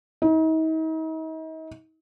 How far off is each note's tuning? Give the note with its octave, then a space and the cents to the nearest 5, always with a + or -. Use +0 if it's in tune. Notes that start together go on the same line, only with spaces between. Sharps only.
D#4 +40